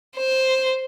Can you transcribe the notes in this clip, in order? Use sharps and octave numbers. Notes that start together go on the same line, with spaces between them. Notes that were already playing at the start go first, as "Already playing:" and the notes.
C5